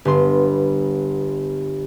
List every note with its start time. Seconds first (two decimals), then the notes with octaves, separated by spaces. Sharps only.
0.05 G1 B3 C6